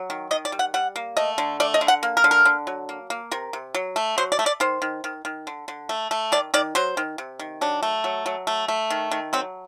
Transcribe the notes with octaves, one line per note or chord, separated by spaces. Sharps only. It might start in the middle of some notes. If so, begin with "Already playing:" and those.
Already playing: F#3
D#3
D#3 D#5
D5
G3
F#5
G3 F#5
A#3
A3 D#5
D3
A3 D5
D#5
D3
F#5
A#3
A#4
D3
A#4
D3
F#3
A#3
A#3
C3 A#4
C3
F#3
A3
F#3 C5
D5
A3
D5
D#3 C5
D#3
D#3
D#3
D3
D3
A3
A3
D#3 D5
D#3 D5
F#3 C5
D#3
C3
D#3
F#3 D4
A3
F#3
F#3
A3
A3
D#3
D#3
F#3 C4